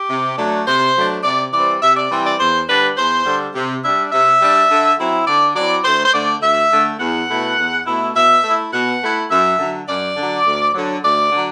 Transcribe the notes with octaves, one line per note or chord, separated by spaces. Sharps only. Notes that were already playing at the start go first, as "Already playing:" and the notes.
Already playing: G4
C3
F#3 A3 D4
C3 C5
F#3 A3 D4
C3 D5
E3 G3 C4 D5
C3 E5
D5
E3 G3 C4
D5
E2 C5
D3 G3 D4 B4
E2 C5
D3 G3 D4
C3
G3 D4 E5
C3 E5
G3 D4
D3
F#3 C4 E4
D3 D5
F#3 C4 E4 D5
D2 C5
C5
D3 A3 D5
D2 E5
D3 A3
E2 F#5
B2 A3 E4
E2
B2 A3 E4
B2 E5
A3 E4
B2 F#5
A3 E4
F#2 E5
D3 F#3
F#2 D5
D3 F#3
D2
D3 F#3
D2 D5
D3 F#3